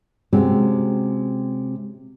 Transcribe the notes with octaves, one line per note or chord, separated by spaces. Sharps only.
C3 G#3 C4 C#4 F#4 G4